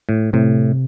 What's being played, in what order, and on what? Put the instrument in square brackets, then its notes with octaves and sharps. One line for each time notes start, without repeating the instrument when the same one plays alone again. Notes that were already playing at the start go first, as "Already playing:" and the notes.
[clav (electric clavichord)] A2
[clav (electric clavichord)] A2 [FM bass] C3